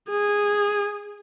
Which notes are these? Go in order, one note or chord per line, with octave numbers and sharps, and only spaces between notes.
G#4